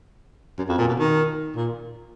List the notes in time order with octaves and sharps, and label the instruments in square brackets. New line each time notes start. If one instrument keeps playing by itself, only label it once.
[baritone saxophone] F#2
F2
A#2
B2
D#3
A#2